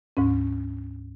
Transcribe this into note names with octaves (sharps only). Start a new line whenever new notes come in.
D2 G#2 C#4